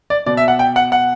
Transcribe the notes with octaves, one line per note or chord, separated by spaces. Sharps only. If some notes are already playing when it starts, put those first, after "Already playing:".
D5
B2 D5
E5
F#5
G5
F#5
F#5